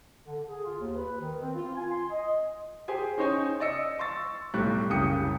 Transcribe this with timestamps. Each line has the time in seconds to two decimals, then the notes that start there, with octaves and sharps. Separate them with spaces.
0.25 D3
0.47 G#4
0.64 F4
0.79 D#2
0.95 B4
1.19 D#3
1.41 C4
1.56 F4
1.75 G#5
1.90 C6
2.10 D#5
2.88 G4 G#4 C5 G#5
3.18 C#4 D#4 C5 C#5 G#5
3.60 D5 D#5 E6 C#7
3.99 C6 C#6 E6 A6
4.54 B1 A2 G3 C#6 F#6
4.89 F#1 C2 C#3 G4 D#6 C#7